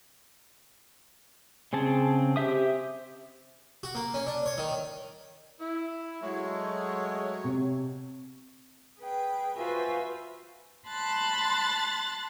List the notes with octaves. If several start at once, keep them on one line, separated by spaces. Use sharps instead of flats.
C#3 C4 G#4 A5
G4 C5 E5 D#6
F#4
A#3
C#4
D4
C#5
D#3
E4
F#3 G#3 A3 C#5
C3
G#4 B4 G5
F4 F#4 B4 C5 E5 G#5
A5 B5 C6 F#6 A6